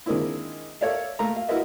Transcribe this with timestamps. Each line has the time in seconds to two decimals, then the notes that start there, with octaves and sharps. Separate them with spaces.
0.06 D#3 G#3 A#3 C4 D4 E4
0.81 A4 A#4 C#5 D5 E5 F5
1.19 A3 A#3 A#4 F5 A#5
1.36 F5
1.48 E4 F#4 A#4 B4 D#5 E5